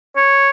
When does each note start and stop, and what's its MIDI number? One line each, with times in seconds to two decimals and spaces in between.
0.16 0.50 73